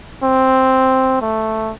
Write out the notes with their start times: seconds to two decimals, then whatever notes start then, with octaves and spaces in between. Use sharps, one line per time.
0.23 C4
1.21 A3